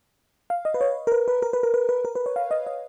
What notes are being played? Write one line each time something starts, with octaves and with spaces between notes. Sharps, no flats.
F5
D#5
B4
C#5
A#4
B4
B4
A#4
B4
A#4
B4
B4
A#4
B4
C#5
F5
D#5
D#5